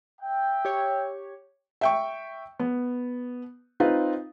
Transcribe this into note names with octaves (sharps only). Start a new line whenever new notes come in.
E5 G5
G4 C#5
E5 G5 C#6
B3
C4 D#4 F4 B4